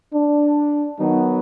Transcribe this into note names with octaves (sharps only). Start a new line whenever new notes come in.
D4
D#3 F#3 B3 D#4